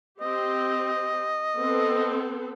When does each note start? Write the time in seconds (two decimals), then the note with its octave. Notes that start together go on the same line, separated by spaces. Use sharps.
0.21 C4 G4 D#5
1.56 B3 C4 A4